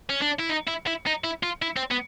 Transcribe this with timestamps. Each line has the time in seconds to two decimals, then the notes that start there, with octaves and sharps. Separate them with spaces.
0.10 C#4
0.22 D4
0.40 E4
0.50 D#4
0.68 E4
0.87 E4
1.07 D#4
1.24 E4
1.43 F4
1.62 E4
1.77 C4
1.91 B3